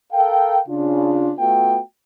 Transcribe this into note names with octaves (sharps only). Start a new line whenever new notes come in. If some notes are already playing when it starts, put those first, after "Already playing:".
A4 A#4 F5 G5
C#3 D4 F4
A3 B3 F4 F#4 G5